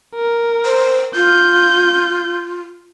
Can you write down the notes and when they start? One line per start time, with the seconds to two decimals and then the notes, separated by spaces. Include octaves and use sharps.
0.15 A#4
0.65 C5
1.15 F4 G6